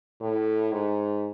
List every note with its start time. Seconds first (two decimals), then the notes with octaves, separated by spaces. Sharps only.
0.21 A2
0.73 G#2